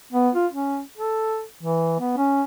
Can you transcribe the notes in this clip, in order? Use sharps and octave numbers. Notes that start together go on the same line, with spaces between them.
B3
F4
C#4
A4
E3
B3
C#4